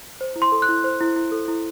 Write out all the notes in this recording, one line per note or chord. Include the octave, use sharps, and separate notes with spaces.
C5
E4
C6
A4
F#6
E4
C5
E4
E4
A4
E4